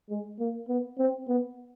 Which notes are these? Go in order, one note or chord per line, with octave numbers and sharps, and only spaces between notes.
G#3
A#3
B3
C4
B3